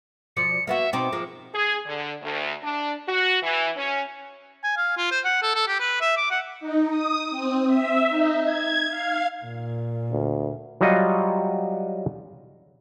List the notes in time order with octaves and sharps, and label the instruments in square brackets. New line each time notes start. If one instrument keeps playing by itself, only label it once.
[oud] B2 F3 D5 [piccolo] C#7
[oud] A#3 B3 F#4 [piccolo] E5
[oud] B2 C4 D#4 [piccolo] D6
[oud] F3 G#3 A#3
[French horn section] G#4
D3
D2
D4
F#4
E3
C#4
[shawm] G#5
F5
F4
C5
F#5
A4
A4
G4
B4
E5
D6
F#5
[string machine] D#4
D#6
C4
E5
D#4
G#6
F5
[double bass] A#2
[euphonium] D2
[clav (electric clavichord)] F#3 G3 F4 D#5 F#5